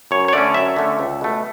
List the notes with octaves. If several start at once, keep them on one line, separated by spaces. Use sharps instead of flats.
F#2 C#5
C#5
D3 A3 C#4 D5
F#2 E5
D3 A3 C#4
C#2
B2 A3